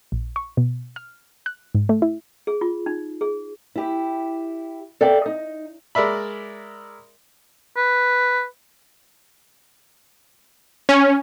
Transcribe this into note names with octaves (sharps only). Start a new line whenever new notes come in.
A#1
C#6
B2
F6
F#6
G#2
A3
E4
G#4
F4
D#4
G#4
E4 G4
A4 D5 E5 F5 G5
D#4
G#3 A#4 D5 E5 B5
B4
C#4